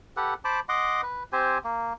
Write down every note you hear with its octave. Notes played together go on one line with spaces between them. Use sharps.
G4 A4 B4 F#5
C5 A5 B5 D6
D#5 F#5 C6 D6
B4
C4 G4 C5 G#5
A#3